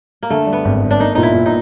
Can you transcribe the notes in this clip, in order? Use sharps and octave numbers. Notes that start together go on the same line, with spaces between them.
A#3
D3 A3
G3
B3
G#1
G2
D4
A#3 D#4
A#2 D#4
E4
A#2
D#4